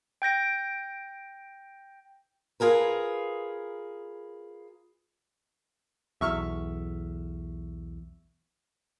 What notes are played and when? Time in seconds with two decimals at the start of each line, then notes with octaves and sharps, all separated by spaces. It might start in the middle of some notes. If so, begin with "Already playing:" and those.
0.22 G5 G6 A#6 D7
2.60 F4 G#4 A#4 B4
6.21 B1 E2 E5 C#6 F6